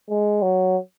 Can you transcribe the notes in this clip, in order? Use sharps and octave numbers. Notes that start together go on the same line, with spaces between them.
G#3
F#3